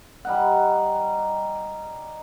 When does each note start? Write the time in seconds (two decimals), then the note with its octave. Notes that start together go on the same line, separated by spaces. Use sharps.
0.25 G3 D#4 F#5